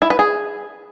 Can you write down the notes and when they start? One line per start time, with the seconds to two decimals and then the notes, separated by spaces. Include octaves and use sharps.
0.02 E4
0.10 B4
0.19 G#4